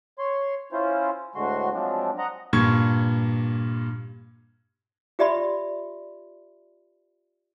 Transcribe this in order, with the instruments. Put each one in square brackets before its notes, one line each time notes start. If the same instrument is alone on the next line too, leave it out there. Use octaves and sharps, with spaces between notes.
[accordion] C#5 C6
C#4 E4 F4 C5
D2 A2 D3 G#3 F#4 C6
F3 F#3 G#3 C4 D4
D#5 F#5 A#5
[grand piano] G2 A#2 C#6 G#6
[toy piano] F4 G4 D5 E5 B5 C6